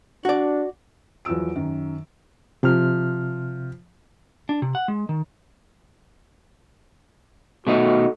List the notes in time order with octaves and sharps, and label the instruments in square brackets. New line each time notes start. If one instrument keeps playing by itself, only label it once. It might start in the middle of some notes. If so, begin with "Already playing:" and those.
[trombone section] D4 [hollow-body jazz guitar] F#4 D5
[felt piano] E2 F3 F#3 E6 D7
F#2 D#3
[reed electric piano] C3 F6 [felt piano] F3
[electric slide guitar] D4
C3
F#5
G#3
D#3
[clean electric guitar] B2 A3 D#4 [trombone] F#4